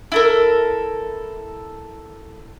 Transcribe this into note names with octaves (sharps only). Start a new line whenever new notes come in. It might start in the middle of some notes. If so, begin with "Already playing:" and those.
E4 A4 A#4